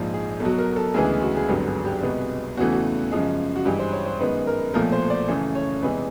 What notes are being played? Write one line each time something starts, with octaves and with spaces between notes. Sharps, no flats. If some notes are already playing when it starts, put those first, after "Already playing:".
Already playing: A#1 G#2 F3 G#3
G#4
B1 B2 F#3 A4
A#4
A4
D2 C#3 E3 G#3 B3 G#4
F#4
G#4
G#1 G2 D3 F#3 B3 G4
G#4
G4
C2 B2 G#3 B3
E2 C#3 E3 A3 F#4
F#4
F#2 C#3 F3 G#3
F#4
G2 E3 G#3 G4
C5
C#5
C5
F#2 D#3 G#3 B3 B4
A#4
B1 A#2 F3 A3 A#4
C5
D5
F#2 C#3 E3 A3
C#5
E2 C3 E3 G#3 B3 B4